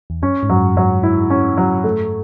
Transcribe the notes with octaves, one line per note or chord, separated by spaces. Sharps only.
E2
F#2 C#4
G#2
F#2 F#3
G#2 F#3
G#2 E4
C#4
F#3
A3